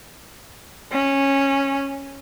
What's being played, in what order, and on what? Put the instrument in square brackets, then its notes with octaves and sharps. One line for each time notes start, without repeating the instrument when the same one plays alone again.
[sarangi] C#4